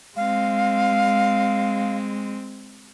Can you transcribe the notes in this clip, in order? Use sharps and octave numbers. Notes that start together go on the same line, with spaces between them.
G#3 C4 F5